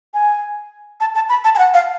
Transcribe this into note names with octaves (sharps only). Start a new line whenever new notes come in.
G#5
A5
A5
B5
A5
G#5
F#5
F5